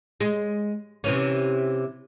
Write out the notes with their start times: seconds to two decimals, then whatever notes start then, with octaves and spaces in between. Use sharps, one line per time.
0.21 G#3
1.04 C3 E3 C#4